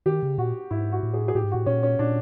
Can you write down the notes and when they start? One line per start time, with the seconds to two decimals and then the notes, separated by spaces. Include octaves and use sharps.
0.06 D#3 G4
0.23 C#3
0.38 A#2 F#4
0.71 G#2 E4
0.92 F#4
1.03 A2
1.14 G#4
1.28 G#4
1.35 A2 G4
1.44 G#2
1.51 A2 F#4
1.66 A#2 C#4
1.83 C#4
1.99 A#2 D4